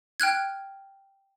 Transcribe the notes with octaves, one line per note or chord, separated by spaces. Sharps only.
G5 F6 F#6 G#6